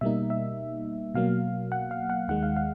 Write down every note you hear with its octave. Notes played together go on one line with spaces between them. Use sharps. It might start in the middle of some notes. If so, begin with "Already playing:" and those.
B2 G3 A#3 D#4 E5
E5
B2 F#3 A#3 F5
F#5
F5
F#5
D#2 D#3 G#3 F#5
F5
F5